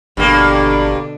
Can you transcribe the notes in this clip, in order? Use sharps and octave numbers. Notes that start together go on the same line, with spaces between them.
G#1 G2 B2 D3 A#3 D4